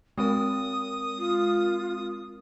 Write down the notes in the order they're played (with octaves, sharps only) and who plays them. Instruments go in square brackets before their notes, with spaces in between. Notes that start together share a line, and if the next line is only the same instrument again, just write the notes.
[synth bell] G#3 C4 A#4 [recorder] D#6
[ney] F4